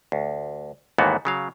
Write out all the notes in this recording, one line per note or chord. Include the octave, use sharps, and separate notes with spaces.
D2
D#2 G#2 E3 A3 B3 F#4
C#3 F#3 F5